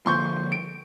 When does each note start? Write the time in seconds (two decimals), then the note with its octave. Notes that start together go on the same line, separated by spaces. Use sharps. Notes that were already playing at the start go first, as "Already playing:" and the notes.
0.06 D3 F3 A#3 C6 C#6 G6
0.52 D7